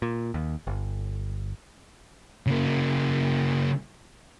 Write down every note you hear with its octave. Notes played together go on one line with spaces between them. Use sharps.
A#2
D#2
G1
C#3 A#3